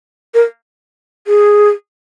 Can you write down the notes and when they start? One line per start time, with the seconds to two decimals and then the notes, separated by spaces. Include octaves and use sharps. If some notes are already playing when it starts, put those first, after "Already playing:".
0.34 A#4
1.27 G#4